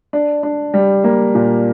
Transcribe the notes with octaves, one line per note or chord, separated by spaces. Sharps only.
D4
D4
G3
A#3
A#2